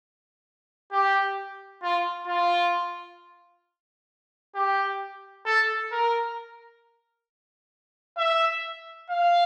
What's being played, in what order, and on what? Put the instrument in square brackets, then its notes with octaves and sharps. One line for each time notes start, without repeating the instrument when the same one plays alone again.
[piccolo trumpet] G4
F4
F4
G4
A4
A#4
E5
F5